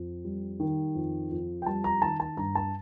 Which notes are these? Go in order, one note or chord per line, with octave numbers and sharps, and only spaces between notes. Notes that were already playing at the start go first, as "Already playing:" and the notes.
Already playing: F2
G3
D#3
F2
F2
G5
G3 A5
A#5
D#3 A5
A5
G2 A#5
A5